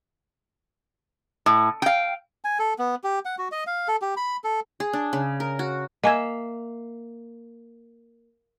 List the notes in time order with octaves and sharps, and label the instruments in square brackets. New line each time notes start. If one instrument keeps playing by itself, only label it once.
[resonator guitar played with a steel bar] A2
F5 G5
[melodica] G#5
A4
B3
G4
F#5
F#4
D#5
F5
A4
G4
B5
A4
[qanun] G#4
D4
C#3
A#4
F#4
[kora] A#3 E5 [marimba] D#5 G#5 G#6